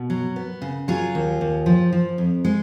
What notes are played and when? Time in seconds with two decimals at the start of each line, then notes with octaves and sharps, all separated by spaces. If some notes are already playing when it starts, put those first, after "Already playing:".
Already playing: B2
0.10 F#3
0.36 B3
0.62 C#3
0.88 F#3 F4 G#4
1.15 D#2
1.41 D#2
1.66 F3
1.93 F3
2.18 F2
2.45 G#3